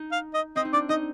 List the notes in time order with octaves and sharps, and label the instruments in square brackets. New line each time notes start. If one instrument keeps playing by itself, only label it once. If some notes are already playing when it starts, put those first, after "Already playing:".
Already playing: [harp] D#4
[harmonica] F5
D#5
[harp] C4 [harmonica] D#5
[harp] D#4
[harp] D4 [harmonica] D5
[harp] D#4 [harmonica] D#5